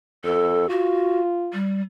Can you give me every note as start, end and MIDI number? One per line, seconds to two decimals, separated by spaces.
0.25 0.68 41
0.25 0.67 69
0.70 1.55 65
0.70 1.21 66
1.53 1.81 55